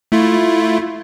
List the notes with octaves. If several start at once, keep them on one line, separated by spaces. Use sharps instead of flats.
A3 E4 F4